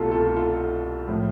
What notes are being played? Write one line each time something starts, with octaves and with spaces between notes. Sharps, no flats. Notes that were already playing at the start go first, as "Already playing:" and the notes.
Already playing: C2 B2 A3 F4 G4 A4
F4 A4
F4 A4
A2 F3 A3